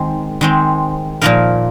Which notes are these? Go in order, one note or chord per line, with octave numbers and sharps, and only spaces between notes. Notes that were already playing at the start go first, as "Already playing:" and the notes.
Already playing: D#3 G#3 C4
D#3 G#3 C4
A#2 F3 A#3 D#4 A#4